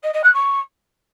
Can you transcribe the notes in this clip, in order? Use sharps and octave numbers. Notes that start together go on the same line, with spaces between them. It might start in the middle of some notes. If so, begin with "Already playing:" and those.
D#5
D#5
F#6
C#6